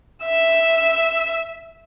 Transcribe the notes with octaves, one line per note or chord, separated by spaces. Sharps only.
E5 E6